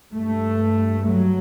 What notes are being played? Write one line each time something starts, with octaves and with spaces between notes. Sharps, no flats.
G2 A3
F#3